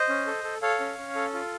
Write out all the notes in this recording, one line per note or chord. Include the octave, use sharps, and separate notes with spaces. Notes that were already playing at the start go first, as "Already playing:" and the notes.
Already playing: C5 D#5
C#4
A4
A4
A4 C#5 F5
C#4
C#4
A4
F4